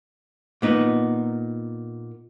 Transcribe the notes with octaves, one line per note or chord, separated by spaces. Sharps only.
A#2 B3 D#4